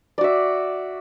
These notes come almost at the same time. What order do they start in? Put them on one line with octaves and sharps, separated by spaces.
D5 F#4 E5